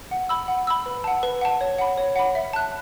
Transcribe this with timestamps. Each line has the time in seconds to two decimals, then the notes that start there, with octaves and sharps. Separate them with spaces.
0.11 F#5
0.29 B5 E6
0.48 F#5
0.67 B5 E6
0.86 B4
1.04 F#5 A5
1.23 B4
1.41 F#5 A5
1.61 C#5
1.78 F#5 B5
1.97 C#5
2.16 F#5 B5
2.35 E5
2.53 A5 F#6